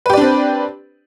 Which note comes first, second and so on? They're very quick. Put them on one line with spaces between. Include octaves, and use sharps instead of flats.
B4 G4 D5 D4 C4